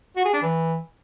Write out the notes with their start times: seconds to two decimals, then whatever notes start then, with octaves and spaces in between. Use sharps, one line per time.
0.16 F#4
0.25 G#4
0.34 D4
0.42 E3